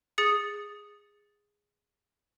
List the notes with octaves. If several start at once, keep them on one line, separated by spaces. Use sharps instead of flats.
G#4 D#6 A6 C#7